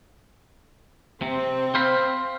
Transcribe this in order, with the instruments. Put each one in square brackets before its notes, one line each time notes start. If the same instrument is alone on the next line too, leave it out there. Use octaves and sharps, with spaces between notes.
[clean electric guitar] C3 [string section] C4
[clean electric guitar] C5 F5 B5